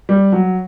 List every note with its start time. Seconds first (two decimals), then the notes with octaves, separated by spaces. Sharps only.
0.09 G3
0.32 F#3